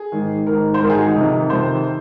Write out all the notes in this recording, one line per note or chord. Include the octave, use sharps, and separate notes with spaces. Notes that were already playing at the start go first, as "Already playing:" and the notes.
Already playing: G#4
G#2 D#3
G#2 D#3 A#4
C5
G#2 D#3 A#4
G#4
F#4
D#4
F2 C3 D#3
F2 C3 D#3 C5